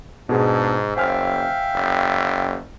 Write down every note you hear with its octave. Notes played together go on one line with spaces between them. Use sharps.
G#2 B2 D4 G#4
F#1 C5 E5 F5 G5 G#5 F6
F#1